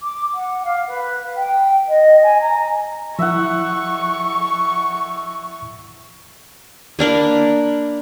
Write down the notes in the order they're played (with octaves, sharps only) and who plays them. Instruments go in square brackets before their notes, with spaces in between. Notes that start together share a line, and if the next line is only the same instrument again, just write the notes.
[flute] D6
F#5
F5
B4
G5
D#5
G#5
A#5
[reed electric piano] F3 E4 [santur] E5 F#5 [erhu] C#6
[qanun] A#3 D4 A#4 B5